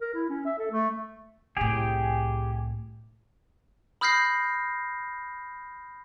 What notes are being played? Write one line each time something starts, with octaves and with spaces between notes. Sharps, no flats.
A#4
E4
C#4
E5
A4
A3
C2 A2 G4 G#4
B5 D#6 F6 G6 A#6 C7